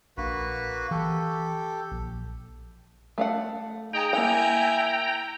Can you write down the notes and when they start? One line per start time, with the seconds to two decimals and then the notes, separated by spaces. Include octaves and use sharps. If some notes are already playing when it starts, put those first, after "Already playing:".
0.17 A#1 A#3 D4 F#4 B4
0.91 E3 G4 A4
1.91 A#1
3.18 A3 F5 F#5
3.93 D#4 G#4 G5 A#5
4.13 A#3 E4 F#5 G#5